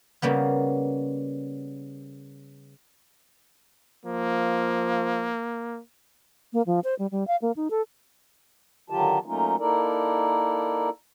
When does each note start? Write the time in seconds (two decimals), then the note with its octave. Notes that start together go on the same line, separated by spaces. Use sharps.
0.22 C#3 G3 A#3 B3
4.06 F3 A#3
6.53 A#3
6.67 F3
6.84 C5
6.99 G3
7.11 G3
7.28 F5
7.42 A#3
7.56 D#4
7.71 A4
8.90 D3 D#3 F#3 F4 G4 A5
9.25 F#3 A3 A#3 C#4 D#4 F4
9.59 A#3 D#4 E4 A4 A#4 D5